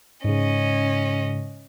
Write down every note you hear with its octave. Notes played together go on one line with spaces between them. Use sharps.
G#2 C#3 C#4 D#5